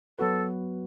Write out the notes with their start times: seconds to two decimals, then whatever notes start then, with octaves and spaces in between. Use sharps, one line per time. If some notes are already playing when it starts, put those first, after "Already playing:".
0.19 F#3 B3 F#4 A4 B4